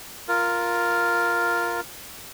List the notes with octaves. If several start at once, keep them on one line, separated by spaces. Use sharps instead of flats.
F4 A#4